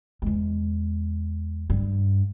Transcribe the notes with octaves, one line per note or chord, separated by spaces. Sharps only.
E2 G#3
G2